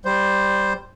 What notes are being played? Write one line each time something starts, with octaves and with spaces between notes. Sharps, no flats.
G3 C5